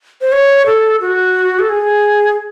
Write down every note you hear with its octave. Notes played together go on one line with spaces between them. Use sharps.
C5
C#5
A4
F#4
A4
G#4